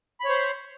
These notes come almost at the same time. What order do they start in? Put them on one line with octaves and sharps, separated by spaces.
B5 C#5 C5